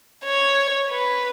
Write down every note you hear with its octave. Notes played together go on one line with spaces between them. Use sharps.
C#5
B4